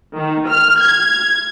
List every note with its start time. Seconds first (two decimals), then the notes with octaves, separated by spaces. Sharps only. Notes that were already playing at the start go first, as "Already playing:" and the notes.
0.15 D#3
0.48 F6
0.79 G#6